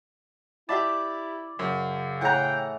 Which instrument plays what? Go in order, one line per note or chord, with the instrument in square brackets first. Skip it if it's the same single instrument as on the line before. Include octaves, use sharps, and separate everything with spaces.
[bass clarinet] E4 [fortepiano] G4 E5 A5 [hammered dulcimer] D5
[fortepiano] F#2 [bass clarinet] C#3
[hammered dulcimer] A2 E3 [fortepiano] F#5 A#5 [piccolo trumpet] G5